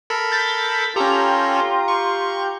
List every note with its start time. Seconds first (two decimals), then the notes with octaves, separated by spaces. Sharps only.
0.10 A4 A#4 B5
0.32 G6 A6 B6
0.96 C#4 F4 G4 A4 A#5 G6
1.88 C#6